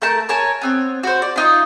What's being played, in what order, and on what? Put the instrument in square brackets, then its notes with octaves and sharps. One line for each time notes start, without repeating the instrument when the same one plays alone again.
[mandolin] A3 A#4 A5 G6
A#4 C#5 G#5 A5
B3 C4 C#5
F#4 C5
D5
D4 D#4 F4